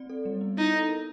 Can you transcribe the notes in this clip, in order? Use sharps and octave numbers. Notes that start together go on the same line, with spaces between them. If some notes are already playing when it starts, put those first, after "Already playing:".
Already playing: C4 D5
A4
G3
B3
D#4 E4
A4
A#4